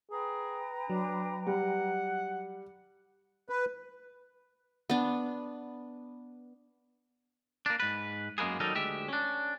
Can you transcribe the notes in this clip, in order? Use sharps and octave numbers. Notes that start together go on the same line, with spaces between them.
G#4 B4 G5 A#5
F#3 D4
G3 F#5
B4
B3 D4
A#3 D4
G#2 B4
F#2 G#3 A#3 B3 G#4
D#3 F#3 G3 D#4 A4 A#4
D2 G#3 G4 E5
C#4 D4